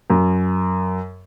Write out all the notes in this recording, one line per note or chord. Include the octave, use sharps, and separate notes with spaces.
F#2